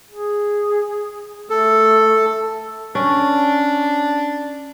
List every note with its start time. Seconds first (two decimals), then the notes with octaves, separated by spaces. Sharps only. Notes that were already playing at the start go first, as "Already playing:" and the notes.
0.11 G#4
1.50 A3 A4
2.95 C#4 D4